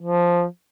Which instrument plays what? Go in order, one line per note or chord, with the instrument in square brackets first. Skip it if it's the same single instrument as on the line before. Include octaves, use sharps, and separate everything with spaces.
[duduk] F3